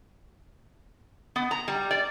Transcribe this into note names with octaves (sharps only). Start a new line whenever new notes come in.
B3
A#5
G3
D5